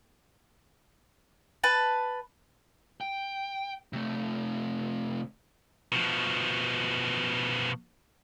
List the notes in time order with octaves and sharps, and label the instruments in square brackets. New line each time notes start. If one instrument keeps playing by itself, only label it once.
[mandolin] B4 A5
[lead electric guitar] G5
C3 A3
[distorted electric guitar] B2 F3